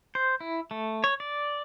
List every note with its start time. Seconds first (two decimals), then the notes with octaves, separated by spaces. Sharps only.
0.15 C5
0.40 E4
0.71 A3
1.04 C#5
1.20 D5